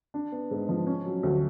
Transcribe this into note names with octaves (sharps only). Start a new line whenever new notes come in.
D4
B3
G#2
F3
C#4
F#3
D2